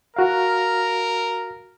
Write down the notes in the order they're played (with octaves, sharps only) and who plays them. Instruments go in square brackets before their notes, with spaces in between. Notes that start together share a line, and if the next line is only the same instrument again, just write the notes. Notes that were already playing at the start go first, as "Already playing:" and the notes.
[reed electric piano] F#4 F5 [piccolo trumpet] A#4